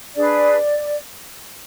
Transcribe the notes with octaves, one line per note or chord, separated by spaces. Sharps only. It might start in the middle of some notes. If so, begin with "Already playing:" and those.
D4 G#4 B4 D5